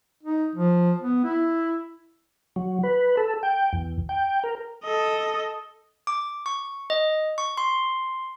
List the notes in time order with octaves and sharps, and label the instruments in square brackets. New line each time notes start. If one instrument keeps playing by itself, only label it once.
[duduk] D#4
F3
B3
E4
[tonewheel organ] F#3
B4
A4
G5
E2
G5
A#4
[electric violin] A4 D#5
[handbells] D6
C#6
D#5
C#6
C6